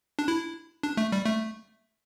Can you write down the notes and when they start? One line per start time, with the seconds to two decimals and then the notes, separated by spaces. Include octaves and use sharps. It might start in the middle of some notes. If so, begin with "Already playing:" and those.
0.19 D4
0.28 E4
0.83 D4
0.97 A3
1.12 G3
1.26 A3